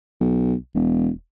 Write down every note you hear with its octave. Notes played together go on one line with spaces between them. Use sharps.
B1
E1